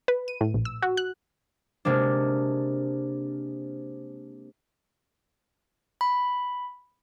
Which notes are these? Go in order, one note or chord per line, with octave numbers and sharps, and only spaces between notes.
B4
D#7
A2
A#1
E6
F#4
F#6
C3 G#3 A#3 D4
B5